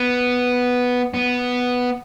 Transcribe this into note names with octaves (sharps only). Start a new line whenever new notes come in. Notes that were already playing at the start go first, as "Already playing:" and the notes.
Already playing: B3
B3